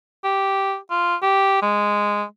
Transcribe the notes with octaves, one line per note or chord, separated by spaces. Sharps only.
G4
F4
G4
G#3